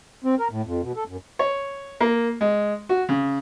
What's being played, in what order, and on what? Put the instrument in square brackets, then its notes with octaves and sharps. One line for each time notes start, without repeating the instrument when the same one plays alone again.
[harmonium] C4
A#4
A2
F2
B2
A4
F#2
[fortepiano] C#5
A#3
G#3
F#4
C#3